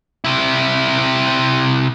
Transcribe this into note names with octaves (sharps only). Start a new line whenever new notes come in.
C3 E4